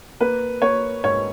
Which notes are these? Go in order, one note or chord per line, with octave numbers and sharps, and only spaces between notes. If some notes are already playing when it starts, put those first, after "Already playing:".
A#3 B4
A#3 C#5
G#2 C#5